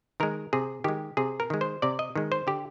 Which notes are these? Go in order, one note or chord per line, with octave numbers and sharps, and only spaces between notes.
D#3 G#3 A#4
C3 G#4
D#3 G#3 G4
C3 G#4
A#4
D#3 G#3
C5
C3 D5
D#5
D#3 G#3
C5
D3 G4